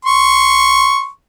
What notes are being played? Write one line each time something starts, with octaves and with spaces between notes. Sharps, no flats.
C6 C#6